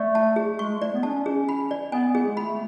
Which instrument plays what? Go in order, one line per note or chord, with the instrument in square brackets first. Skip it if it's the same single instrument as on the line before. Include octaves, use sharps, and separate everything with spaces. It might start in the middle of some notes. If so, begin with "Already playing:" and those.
Already playing: [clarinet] A3 [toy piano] D5
[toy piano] A5
G#4
[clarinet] G#3 [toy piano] C#6
[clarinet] A3
[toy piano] D5
[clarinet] B3
[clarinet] D4 [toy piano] A5
[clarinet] C#4
[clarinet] C#4 [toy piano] G#4
[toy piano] B5
D5
[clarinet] B3 [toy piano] G#5
[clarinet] B3
[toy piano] G#4
[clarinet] G#3
[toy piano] B5
[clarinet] A3